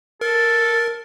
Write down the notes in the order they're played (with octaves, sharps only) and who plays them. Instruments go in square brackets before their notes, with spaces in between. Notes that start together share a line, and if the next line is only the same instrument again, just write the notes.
[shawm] A4 [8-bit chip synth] A#4